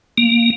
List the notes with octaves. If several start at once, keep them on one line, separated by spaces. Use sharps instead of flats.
A#3